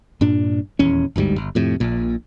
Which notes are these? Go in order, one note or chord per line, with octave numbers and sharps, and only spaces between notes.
G2 A#2 D4
D#1 E2 C#4
G1 D2 G#2 G3
G1
F2 A2 C3
A#1 A#2